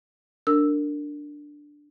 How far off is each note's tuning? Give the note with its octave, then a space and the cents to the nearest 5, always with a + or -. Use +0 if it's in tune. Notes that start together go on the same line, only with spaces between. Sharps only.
D4 +0 A#4 -25 E6 +0